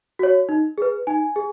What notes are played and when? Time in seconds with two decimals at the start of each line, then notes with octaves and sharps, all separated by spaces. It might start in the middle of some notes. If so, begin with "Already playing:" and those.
0.19 F#4 C#5
0.49 D#4
0.78 G#4 B4
1.07 D#4 G#5
1.36 G#4